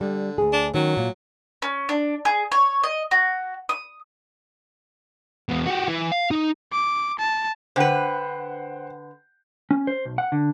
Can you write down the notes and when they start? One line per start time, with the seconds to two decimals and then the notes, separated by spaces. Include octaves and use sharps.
0.01 D3 G3
0.38 D2 G#4
0.53 D4
0.74 D#3 F#3 C#4
0.97 A#2
1.62 C#4
1.89 D4
2.25 G#4
2.52 C#5
2.84 D#5
3.11 F#4
3.69 D#6
5.49 E2 B2
5.66 F#4 G4
5.88 E3
6.12 F5
6.31 D#4 D#5
6.72 D6
7.19 A5
7.76 D3 B4 C5 F#5 G5
9.71 C#4
9.87 C5
10.05 B1
10.18 F#5
10.32 D3